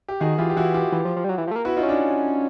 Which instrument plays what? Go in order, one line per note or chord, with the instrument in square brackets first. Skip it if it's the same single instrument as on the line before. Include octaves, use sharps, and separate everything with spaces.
[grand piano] G4
[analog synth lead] D#3 [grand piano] F#4 G#4
[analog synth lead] E3 [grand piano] F4 G4
[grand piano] G4
[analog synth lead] E3 [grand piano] E4 F#4
[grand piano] F4 G4
[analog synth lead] E3
F3
F3
G3
F#3
E3
F3
A3
A#3
[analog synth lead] B3 [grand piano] E4 F#4
[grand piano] D#4 F4
[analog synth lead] C#4
[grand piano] D4 E4